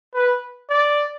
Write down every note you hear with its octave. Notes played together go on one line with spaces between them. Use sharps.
B4
D5